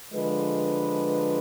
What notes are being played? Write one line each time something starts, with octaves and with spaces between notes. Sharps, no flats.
D3 F3 G#3 B4